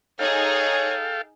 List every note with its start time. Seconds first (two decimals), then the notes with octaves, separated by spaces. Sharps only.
0.19 D#4 G#4 A4 C#5 F5 G5